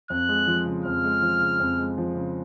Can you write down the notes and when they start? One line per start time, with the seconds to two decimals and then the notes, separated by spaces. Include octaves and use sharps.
0.10 F2 F#6
0.29 G#3
0.47 F3
0.66 C#3
0.85 F2 F6
1.04 G#3
1.22 F3
1.41 C#3
1.60 F2
1.78 G#3
1.98 F3
2.15 C#3